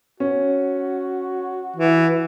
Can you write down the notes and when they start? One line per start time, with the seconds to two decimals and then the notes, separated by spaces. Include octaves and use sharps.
0.20 C#4 F#4
1.76 E3